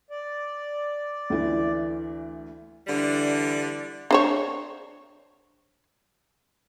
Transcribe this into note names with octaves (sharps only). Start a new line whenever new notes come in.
D5
D2 E3
D3 E3 G3 D4
D4 C5 C#5